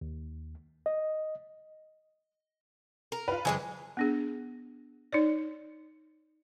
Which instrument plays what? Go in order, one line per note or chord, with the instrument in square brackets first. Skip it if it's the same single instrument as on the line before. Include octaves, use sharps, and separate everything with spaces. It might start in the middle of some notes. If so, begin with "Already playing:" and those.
[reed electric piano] D#2
D#5
[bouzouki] A#4
[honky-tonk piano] F4 B4
[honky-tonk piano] F#1 [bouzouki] E3 G#3 B4
[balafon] B3 D4 G#4
D#4 C#5 D5